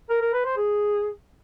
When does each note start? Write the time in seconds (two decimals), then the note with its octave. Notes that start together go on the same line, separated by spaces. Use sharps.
0.10 A#4
0.21 A#4
0.33 B4
0.45 C5
0.57 G#4